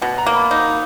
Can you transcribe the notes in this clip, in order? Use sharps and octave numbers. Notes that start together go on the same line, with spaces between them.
B2 F#5
A#5
A#3
B5
D#4